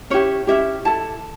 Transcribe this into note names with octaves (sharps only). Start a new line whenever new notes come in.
C#4 E4 G4 C#5
C#4 E4 G4 E5
E4 A4 A5